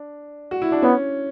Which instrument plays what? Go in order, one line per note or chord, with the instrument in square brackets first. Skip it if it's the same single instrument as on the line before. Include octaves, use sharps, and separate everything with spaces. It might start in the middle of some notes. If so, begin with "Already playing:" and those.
Already playing: [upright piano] D4
F#4
E4
D4
[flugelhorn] B3 [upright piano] C#4